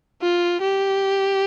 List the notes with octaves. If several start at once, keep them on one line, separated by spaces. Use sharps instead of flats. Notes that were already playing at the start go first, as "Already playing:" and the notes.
F4
G4